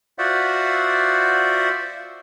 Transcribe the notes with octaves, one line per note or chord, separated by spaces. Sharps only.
F4 F#4 C5 D5 E5 F#5